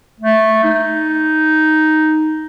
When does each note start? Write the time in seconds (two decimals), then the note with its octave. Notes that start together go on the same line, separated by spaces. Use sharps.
0.20 A3
0.64 D#4